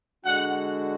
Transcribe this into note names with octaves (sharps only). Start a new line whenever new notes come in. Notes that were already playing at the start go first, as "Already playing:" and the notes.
D3 G#3 D4 F#4 F#5